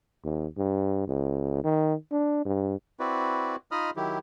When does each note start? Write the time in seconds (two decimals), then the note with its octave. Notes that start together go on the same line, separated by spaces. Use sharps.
0.24 D#2
0.57 G2
1.08 C#2
1.64 D#3
2.11 D4
2.45 G2
3.00 C4 E4 F#4 B4 D5
3.71 D#4 F4 D#5 B5 D#6 F6
3.96 D#3 F#3 E4 G4